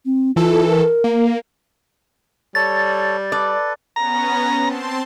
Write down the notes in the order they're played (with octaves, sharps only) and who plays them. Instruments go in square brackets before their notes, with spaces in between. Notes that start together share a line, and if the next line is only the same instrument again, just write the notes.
[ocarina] C4
[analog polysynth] E3 A4 [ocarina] F4
[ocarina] A#4
[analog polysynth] A#3
[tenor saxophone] G3 [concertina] A4 C#5 [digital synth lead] A6
[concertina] A4 B4 [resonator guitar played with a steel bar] D5
[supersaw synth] B3 C#4 [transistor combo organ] A#5
[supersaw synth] C4 A5 C6